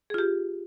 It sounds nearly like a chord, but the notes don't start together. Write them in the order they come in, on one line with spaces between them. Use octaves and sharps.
G#4 F4 G4